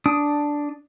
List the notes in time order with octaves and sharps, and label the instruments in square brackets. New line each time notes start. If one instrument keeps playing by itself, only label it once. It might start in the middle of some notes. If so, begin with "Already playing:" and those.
[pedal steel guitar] D4 D#6